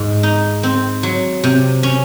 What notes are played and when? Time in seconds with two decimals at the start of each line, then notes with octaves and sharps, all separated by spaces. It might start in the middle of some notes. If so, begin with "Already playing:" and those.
Already playing: G#2
0.23 D#4
0.63 C4
1.03 F#3
1.44 C3
1.83 C#4